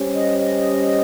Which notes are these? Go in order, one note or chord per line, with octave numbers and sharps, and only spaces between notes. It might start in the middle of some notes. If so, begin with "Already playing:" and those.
Already playing: G3 C#4 G4 C5
D#5
D#5